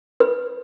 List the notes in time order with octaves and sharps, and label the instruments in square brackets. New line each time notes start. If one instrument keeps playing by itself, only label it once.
[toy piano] B4